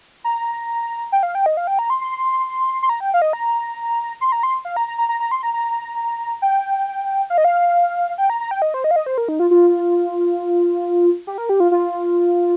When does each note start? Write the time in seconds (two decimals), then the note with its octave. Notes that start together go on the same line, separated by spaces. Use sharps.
0.24 A#5
1.12 G5
1.23 F5
1.35 G5
1.46 D#5
1.57 F5
1.67 G5
1.79 A#5
1.90 C6
2.01 C6
2.82 C6
2.89 A#5
3.00 G5
3.14 F5
3.22 D#5
3.33 A#5
4.21 C6
4.32 A#5
4.43 C6
4.65 F5
4.77 A#5
4.88 A#5
4.98 A#5
5.09 A#5
5.20 A#5
5.31 C6
5.43 A#5
5.54 A#5
6.42 G5
7.30 F5
7.38 D#5
7.45 F5
8.18 G5
8.30 A#5
8.40 A#5
8.51 G5
8.62 D#5
8.74 C5
8.84 D#5
8.91 F5
8.96 D#5
9.06 C5
9.18 A#4
9.28 D#4
9.39 F4
9.51 F4
11.27 G4
11.38 A#4
11.49 G4
11.60 F4
11.71 F4